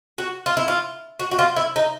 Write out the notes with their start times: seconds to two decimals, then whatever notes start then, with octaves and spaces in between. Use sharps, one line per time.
0.18 F#4
0.46 F4
0.57 E4
0.68 F4
1.20 F#4
1.31 F#4
1.39 F4
1.56 E4
1.76 D#4